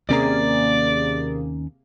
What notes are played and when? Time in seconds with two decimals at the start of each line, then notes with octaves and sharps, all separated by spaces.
0.09 D#2 C3 A#3 C#4 G#4 D5 A#5